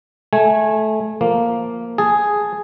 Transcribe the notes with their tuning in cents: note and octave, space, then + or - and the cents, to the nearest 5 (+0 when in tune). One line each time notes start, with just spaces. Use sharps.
A3 -20 G#5 +0
F3 +0 A#3 +0
G#4 +0 A5 +0